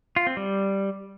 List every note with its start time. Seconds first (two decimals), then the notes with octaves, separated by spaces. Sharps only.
0.16 F4
0.27 C4
0.37 G3